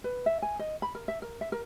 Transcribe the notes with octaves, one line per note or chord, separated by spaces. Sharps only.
B4
E5
G#5
D#5
B5
A#4
E5
A#4
E5
A#4